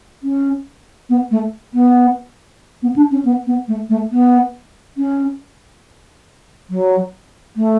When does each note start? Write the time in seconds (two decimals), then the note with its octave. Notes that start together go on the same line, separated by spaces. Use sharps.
0.23 C#4
1.10 B3
1.31 A3
1.74 B3
2.83 B3
2.96 D4
3.11 C#4
3.25 B3
3.47 B3
3.68 A3
3.90 A3
4.12 B3
4.98 C#4
6.70 F#3
7.57 A3